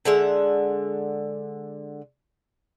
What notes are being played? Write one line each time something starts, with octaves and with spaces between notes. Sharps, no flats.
D3 G#3 E5